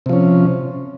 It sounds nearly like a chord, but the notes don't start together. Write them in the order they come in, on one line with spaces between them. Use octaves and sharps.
C3 F3 C#4